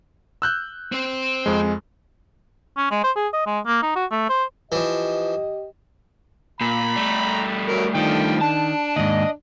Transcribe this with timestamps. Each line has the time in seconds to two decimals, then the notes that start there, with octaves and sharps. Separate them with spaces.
0.42 E6 F#6 G6
0.92 C4 C5
1.46 F2 G#3
2.77 C#4
2.91 G#3
3.04 C5
3.16 G#4
3.33 D#5
3.47 G#3
3.67 A#3
3.82 D#4
3.96 F#4
4.11 A3
4.29 C5
4.72 E3 F3 G4 D#5
6.61 A#2 A#5 B5
6.96 G3 A3
7.68 F#3 A#4
7.95 D3 D#3 F3 G5
8.41 D4 A5
8.96 D#2 G#2 D#5